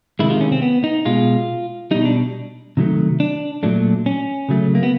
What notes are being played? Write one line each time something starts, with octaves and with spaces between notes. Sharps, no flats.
C3 D#3 G#3 E4
F4
C#4
C4
B3
D#4
B2 G#3 F4
B2 G3 D#4
D4
C3 D#3 F#3 A3
D4
A#2 F#3 A3 D4
C#4
C#3 F#3 A3
A#3
B3